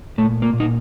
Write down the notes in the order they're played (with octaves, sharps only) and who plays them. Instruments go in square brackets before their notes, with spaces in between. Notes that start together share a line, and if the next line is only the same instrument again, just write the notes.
[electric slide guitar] A#2 A3
A#3
A#2
D#4